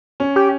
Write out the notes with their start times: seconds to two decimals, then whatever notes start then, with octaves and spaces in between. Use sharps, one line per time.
0.20 C#4
0.36 G4